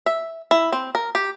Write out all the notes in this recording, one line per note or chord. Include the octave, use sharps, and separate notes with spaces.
E5
E4
C4
A#4
G4